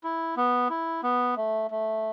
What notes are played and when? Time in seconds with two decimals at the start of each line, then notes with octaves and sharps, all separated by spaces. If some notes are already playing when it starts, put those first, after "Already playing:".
0.04 E4
0.37 B3
0.70 E4
1.03 B3
1.37 A3
1.71 A3